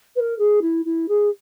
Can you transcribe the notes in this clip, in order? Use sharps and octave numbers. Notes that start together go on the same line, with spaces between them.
B4
A#4
G#4
E4
E4
G#4